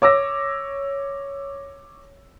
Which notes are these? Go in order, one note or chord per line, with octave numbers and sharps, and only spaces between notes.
C#5 D6 E6 A#6